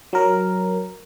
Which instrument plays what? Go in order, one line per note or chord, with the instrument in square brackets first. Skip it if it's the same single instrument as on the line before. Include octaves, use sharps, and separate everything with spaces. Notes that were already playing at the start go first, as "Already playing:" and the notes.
[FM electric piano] F#3 A#4